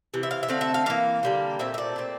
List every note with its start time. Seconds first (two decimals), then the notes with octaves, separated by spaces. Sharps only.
0.14 C3 E3
0.23 E5
0.31 F5
0.43 E5
0.48 D3 A3 C4 F5
0.61 E5
0.74 F5
0.86 E3 A#3 F5
1.23 D3 G3 A#3
1.59 A#2 A3 C4 E5
1.74 E5
1.78 D5
1.96 A#2 A3 C4